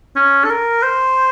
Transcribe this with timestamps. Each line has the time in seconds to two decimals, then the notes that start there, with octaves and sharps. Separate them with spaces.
0.16 C#4
0.44 A4
0.50 A#4
0.83 C5